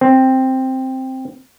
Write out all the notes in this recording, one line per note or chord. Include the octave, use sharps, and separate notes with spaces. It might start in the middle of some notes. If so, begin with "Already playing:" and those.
C4